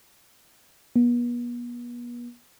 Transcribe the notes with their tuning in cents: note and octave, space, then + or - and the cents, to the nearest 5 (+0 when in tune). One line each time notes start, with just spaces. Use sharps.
B3 -40